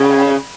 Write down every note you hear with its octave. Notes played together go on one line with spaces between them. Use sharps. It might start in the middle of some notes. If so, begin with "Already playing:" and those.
Already playing: C#3